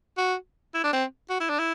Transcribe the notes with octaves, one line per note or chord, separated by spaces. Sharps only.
F#4
E4
D4
C4
F#4
E4
D4
E4